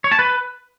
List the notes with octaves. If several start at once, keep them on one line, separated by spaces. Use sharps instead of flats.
C#5
A5
B4